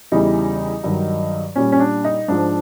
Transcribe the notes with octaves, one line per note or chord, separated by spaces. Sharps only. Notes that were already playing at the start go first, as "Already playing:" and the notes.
E2 C#3 E3 G3 D#4
G2 D#3 F#3
A#2 G3 C#4
C#4
D4
D#4
G#2 F3 D4